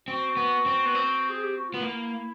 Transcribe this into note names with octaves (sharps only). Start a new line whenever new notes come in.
C4 F#4
B3
C4
B3
C4
G#4
G4
F#4
F4
B3
A#3 E4